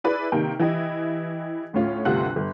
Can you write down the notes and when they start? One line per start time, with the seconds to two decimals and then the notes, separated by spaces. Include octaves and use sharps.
0.04 E4 G#4 B4 D5
0.32 C3 D#3 A#3 G5
0.59 E3 E4 G4 D#5
1.73 D2 A2 A3 C#4 F4
2.05 G1 D2 C3 F4 F#5 F#6
2.36 G1